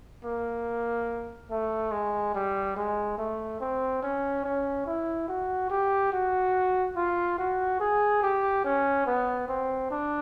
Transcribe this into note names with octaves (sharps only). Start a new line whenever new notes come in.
A#3
A3
G#3
G3
G#3
A3
C4
C#4
C#4
E4
F#4
G4
F#4
F4
F#4
G#4
G4
C#4
B3
C4
D4